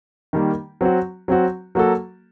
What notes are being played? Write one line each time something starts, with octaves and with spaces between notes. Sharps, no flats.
D#3 G3 A#3
F#3 C4 F#4
F#3 C4 F#4
F#3 A#3 F#4 A4